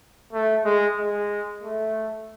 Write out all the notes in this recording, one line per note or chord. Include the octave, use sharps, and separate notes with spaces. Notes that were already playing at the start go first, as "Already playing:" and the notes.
A3
G#3
G#3
A3